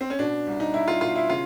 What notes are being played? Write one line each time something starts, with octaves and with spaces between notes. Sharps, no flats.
C4
C#4
B2 D4
C2
D#4
C2 E4
F4
B2 F4
E4
C#3 F4